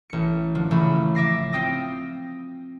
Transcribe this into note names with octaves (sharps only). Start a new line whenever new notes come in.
A1 C#7
D3 F3
A1 C#3 A3 B5
E5 D6 A#6 C7
C4 F4 G5 D#6 A#6